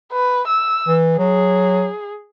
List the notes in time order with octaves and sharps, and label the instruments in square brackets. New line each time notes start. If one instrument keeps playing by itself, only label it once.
[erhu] B4
E6
[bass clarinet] E3
[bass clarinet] F#3 [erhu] G#4